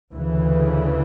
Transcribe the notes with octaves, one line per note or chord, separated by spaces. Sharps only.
D2 C#3 E3